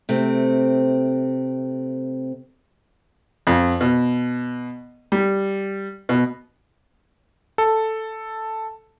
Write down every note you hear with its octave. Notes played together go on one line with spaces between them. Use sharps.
C3 A3 C4
F2
B2
G3
B2
A4